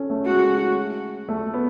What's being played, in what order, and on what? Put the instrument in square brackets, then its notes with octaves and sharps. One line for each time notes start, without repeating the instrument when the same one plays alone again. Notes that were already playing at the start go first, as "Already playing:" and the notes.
Already playing: [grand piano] C#4 A4
A3
[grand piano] G#3 [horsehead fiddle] F#4
[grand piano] A3
B3